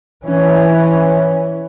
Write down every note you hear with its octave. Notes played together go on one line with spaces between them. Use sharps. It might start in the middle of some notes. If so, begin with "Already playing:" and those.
E3 C#4